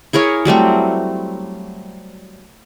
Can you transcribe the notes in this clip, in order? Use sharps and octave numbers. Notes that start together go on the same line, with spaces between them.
E4 G#4 A#4 C#5
F#3 G3 A3 C4